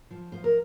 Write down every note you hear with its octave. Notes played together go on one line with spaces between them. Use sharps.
F3
F3 C5
A#4